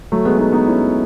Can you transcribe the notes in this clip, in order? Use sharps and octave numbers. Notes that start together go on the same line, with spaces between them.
F#3 A3
G#3 B3
B3 D#4
B3 D#4
C#4 E4